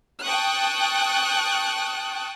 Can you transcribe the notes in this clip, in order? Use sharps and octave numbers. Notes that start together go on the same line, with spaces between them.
G5 A5 C#6 D#6 F#6